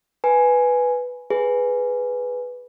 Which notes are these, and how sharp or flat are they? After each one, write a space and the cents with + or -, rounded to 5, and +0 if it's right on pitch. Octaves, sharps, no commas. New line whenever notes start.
B4 +0 G#5 +5
G#4 +0 B4 +0